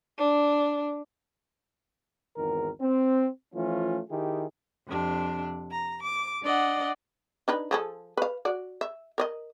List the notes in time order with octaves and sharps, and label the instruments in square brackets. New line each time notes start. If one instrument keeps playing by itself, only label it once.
[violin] D4
[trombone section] G#1 E2 D#3 A#4
C4
E3 F3 A3 C#4 F4
D#3 E4 G4 G#4
[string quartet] F2 C3 D4
A#5
D6
D4 D5 D#5 F#5
[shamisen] D4 D#4 B4
F3 G#4 A4
B4 F5
F#4 D5
E5
A#4 D5 D#5